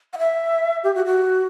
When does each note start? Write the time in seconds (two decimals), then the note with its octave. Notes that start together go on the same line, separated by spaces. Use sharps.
0.13 F#5
0.18 E5
0.84 G4
0.95 F#4
1.06 F#4